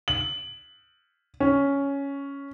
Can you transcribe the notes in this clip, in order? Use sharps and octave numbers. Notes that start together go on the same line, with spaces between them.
F#7
C#4